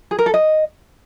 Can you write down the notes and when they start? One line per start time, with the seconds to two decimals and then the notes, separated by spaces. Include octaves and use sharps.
0.11 G#4
0.19 A#4
0.26 A4
0.34 D#5